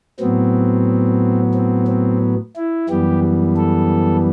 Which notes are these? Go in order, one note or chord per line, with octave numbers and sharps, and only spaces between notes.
A2 F#3 B3 C4
C4
C4
E4
F#2 E3 G3 B3 G4
A4